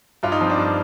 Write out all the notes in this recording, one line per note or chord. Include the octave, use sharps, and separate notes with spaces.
G2 F4
D#4
F3 C4
D4
G2